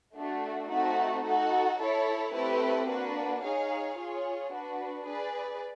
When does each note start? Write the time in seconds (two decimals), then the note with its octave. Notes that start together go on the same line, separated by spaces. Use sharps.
0.16 A3 D4 F#4
0.70 A3 C4 D#4 F#4
1.25 D#4 F#4 A4
1.79 E4 A4 C#5
2.33 A3 C4 E4 G4 B4
2.88 A#3 D4 F#4 B4
3.43 D#4 G#4 C#5 F5
3.96 F4 G#4 C#5
4.51 D4 F#4 B4
5.06 G#4 B4 D5